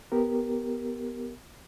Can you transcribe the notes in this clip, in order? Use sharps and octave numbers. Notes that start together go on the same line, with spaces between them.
B3 G4 A#4